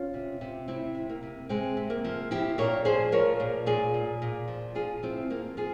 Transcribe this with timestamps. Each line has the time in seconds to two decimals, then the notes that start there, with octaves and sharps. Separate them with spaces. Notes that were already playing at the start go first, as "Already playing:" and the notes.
Already playing: C#4 F4
0.14 C3
0.41 C3
0.68 C3 C4 E4
0.95 C3
1.09 A#3
1.23 C3
1.49 C3 G#3 C4
1.77 C3
1.90 A#3
2.04 F3
2.31 F3 E4 G4
2.58 A#2 A#4 C#5
2.85 F3 G#4 C5
3.12 F3 A#4 C#5
3.40 A#2
3.66 A#2 F4 G#4
3.94 A#2
4.22 A#2
4.48 F3
4.75 F3 F4 G#4
5.03 F3 C4 E4
5.30 F3 A#3
5.57 F3 F4 G#4